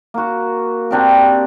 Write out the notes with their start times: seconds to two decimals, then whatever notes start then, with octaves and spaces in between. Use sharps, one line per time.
0.14 A#3 F#4
0.91 C4 D4 G4 A#4